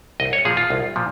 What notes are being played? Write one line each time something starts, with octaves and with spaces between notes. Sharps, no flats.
C2 D#5
C#5
A#2 F3 G#4
F4
C2
A#2 F3